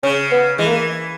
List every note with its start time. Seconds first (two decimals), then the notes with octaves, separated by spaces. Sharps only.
0.03 C#3 C#4
0.31 B3
0.58 E3 G#3
0.66 A#3